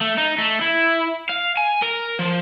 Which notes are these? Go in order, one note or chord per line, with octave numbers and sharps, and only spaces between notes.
A3
D#4
A3
E4
F5
G#5
A#4
F3